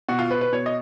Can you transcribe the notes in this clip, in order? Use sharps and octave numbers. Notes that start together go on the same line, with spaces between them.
B2 F#4
F4
B4
B4
B2 C#5
D#5